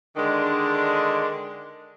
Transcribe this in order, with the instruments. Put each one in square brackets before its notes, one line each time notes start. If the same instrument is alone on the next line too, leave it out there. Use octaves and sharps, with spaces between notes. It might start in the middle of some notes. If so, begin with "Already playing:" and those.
[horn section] D3 D#3 G#3 D4